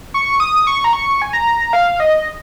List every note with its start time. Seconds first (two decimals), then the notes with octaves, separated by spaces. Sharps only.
0.14 C#6
0.40 D#6
0.67 C#6
0.84 A#5
0.93 C#6
1.22 G#5
1.33 A#5
1.73 F5
2.00 D#5